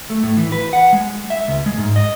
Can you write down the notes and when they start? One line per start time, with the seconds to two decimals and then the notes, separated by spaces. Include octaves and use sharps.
0.10 A3
0.23 A2
0.37 E3
0.52 B4
0.73 F#5
0.93 G#3
1.30 E5
1.48 C#2
1.66 G#3
1.78 G#2
1.96 D#5